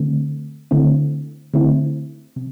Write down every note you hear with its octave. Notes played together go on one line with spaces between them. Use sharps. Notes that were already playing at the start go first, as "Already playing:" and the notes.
Already playing: D3 A3 C4
D3 A3 C4 E4
D3 A3 C4 E4
C3